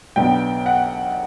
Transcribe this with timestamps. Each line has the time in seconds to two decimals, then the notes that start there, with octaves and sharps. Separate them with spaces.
0.16 B1 B2 F#3 B3 D4 G5
0.66 F#5